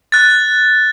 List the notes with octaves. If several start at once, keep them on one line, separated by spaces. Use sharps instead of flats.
F#6 A6